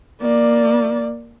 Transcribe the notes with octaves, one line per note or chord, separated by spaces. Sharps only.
A#3 D5